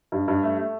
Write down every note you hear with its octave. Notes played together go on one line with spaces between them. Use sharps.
G2
G2
A3
A3